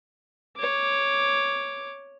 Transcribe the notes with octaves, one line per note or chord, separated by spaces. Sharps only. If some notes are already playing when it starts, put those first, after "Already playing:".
C#5 D6